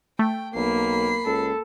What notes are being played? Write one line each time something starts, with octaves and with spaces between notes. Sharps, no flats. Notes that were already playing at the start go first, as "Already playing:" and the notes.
A3 G5
B1 A#3 B5 C7
C#2 A4